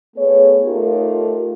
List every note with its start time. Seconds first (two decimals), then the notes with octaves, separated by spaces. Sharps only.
0.17 A3 B3 G#4 C#5
0.64 A3 D#4 F4 G4 A4 A#4